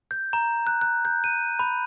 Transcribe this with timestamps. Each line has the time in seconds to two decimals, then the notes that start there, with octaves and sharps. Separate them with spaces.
0.11 G6
0.33 A#5
0.67 F#6
0.81 F#6
1.05 G6
1.24 D#7
1.59 B5